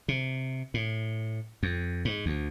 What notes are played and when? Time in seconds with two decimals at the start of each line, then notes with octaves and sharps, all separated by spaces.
0.08 C3
0.74 A2
1.63 F2
2.05 G#2
2.26 D2